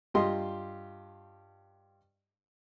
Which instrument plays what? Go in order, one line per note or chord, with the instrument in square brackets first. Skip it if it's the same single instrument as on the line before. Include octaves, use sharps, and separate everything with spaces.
[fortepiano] G2 F4 G4 D#5 C6